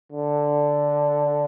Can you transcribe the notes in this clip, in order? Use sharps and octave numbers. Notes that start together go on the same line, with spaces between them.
D3